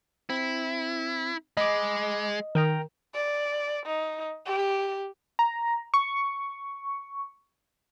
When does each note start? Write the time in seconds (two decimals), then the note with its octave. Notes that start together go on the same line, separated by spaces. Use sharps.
0.30 C4 E4
1.57 G#3 D#5 B5 D6
2.55 D#3 A#4 G5 A#5
3.15 D5
3.86 D#4
4.46 G4
5.39 A#5
5.94 C#6